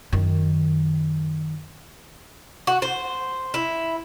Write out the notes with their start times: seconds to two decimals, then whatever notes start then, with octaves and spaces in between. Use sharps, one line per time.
0.13 F#2 D#3
2.67 F#4
2.82 C5
3.54 E4